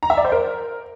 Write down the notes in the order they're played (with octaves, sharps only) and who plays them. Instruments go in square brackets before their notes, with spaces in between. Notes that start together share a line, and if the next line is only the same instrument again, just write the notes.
[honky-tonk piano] A#5
E5
D5
C5
A#4